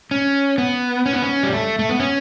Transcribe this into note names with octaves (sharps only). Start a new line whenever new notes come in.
C#4
B3
C#4
B3
C#4
G3
A3
A3
B3
C#4